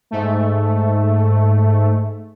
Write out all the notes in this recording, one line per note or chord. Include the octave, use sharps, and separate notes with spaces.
G#2 A3